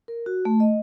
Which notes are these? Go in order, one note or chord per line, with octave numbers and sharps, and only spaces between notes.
A#4
F#4
A3
D#5